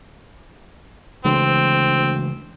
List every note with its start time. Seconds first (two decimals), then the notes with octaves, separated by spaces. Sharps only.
1.25 D2 C#3 E3 G#3 C4